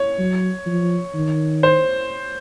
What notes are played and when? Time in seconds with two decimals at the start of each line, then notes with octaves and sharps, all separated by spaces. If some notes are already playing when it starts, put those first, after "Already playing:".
Already playing: C#5
0.19 F#3
0.66 F3
1.15 D#3
1.63 C5